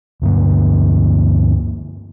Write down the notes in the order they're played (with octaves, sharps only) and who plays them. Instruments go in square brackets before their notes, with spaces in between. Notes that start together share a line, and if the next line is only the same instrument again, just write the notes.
[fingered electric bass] D2 G2 D3 A#3